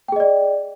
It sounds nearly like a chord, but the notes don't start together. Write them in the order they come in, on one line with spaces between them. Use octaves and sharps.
G5 G#4 D#5 D5